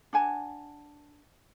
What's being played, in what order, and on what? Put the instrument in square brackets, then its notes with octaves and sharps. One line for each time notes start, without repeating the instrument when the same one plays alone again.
[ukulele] D4 F#5 G#5 A5